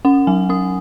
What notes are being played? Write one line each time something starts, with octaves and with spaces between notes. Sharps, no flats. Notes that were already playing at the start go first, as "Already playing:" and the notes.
C#4 F#5
F#3 G#5
C#4 D#6